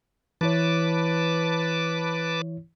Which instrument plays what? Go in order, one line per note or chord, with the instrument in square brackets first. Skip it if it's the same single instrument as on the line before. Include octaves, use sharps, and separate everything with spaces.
[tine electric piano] E3 E4 C#5 [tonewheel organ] B4 A5 D6